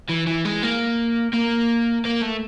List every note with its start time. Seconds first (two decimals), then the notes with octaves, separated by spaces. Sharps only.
0.10 E3
0.27 E3
0.45 G#3
0.63 A#3
1.34 A#3
2.05 A#3
2.22 A3